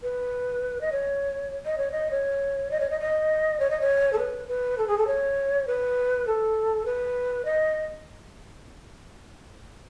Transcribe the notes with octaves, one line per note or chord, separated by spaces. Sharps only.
B4
D#5
C#5
D#5
C#5
D#5
C#5
D#5
C#5
D#5
D#5
C#5
D#5
C#5
A4
B4
B4
A4
G#4
A4
C#5
B4
A4
B4
D#5